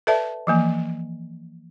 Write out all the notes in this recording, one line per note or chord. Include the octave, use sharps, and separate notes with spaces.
A4 B4 D5 E5 A5
E3 F3 A#3